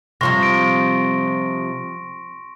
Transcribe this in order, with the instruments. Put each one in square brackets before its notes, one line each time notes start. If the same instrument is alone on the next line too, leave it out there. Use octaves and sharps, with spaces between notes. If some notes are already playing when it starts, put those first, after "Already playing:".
[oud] C3 F3 G3 [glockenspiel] C6 C#6 A#6
[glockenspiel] D7